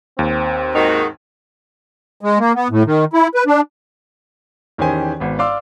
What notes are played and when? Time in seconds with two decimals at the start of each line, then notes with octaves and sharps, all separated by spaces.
0.19 D#2 C4
0.74 G#2 D#3 D#4 F#4
2.21 G#3
2.39 A#3
2.55 B3
2.71 A2
2.86 D#3
3.13 E4
3.35 B4
3.47 D4
4.78 E2 D#3 C#4 G4 C5 G#5
5.20 G#1 B3
5.39 D5 F5 C6 D6 E6